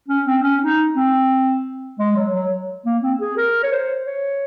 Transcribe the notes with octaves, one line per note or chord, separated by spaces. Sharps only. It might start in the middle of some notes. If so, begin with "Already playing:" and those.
C#4
C4
C#4
D#4
C4
G#3
F#3
F#3
A#3
C4
G#4
A#4
C#5
C5
C#5